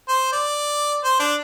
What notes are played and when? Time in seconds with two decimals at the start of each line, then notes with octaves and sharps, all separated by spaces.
0.09 C5
0.33 D5
1.04 C5
1.20 D4